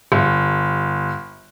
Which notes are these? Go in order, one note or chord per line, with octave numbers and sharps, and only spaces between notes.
G1